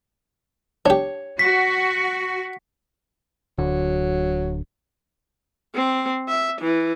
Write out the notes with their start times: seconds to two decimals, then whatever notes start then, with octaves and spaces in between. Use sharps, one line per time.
0.86 D4 G4 C#5
1.39 F#4 B6
3.59 D1 D3 F#3
5.75 C4
6.28 E5
6.62 E3